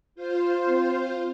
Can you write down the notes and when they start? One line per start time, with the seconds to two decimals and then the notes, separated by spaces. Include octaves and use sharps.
0.15 F4 C5
0.69 C4